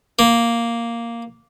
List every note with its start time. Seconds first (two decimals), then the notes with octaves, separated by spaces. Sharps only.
0.19 A#3